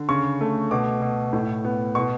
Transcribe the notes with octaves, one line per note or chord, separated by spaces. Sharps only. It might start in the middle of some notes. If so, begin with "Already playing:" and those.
Already playing: D3
C#3 C#6
A3
B2 D6
B2
A2
B3
B2 C#6